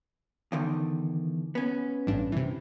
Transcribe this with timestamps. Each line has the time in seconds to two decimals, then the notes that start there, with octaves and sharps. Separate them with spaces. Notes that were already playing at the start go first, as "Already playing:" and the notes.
0.52 E2 D3 D#3
1.55 B3 C#4
2.07 A1 G2 D4
2.32 C3 E3